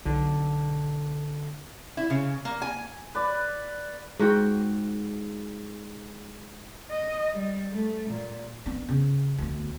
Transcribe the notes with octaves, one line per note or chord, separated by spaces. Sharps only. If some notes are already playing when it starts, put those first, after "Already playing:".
B1 D3
E4
C#3
A#3
G#5
B4 D5
G#2 F#4 G5
D#5
G3
A3
A#2
B3 D4
C#3
D2 B3